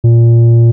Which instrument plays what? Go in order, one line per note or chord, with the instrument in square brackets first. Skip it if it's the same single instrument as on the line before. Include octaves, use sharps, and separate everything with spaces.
[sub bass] A#2